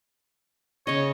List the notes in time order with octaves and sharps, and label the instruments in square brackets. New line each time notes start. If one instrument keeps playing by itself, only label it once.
[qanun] C#3 D#5 [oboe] C#5